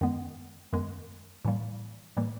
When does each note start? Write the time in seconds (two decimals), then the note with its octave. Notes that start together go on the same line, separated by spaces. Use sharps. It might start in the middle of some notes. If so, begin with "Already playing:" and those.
0.01 F#2 D#3 G#3 B3
0.73 F#2 D#3 G#3 B3
1.45 A2 E3 G3 A#3
2.17 A2 E3 G3 A#3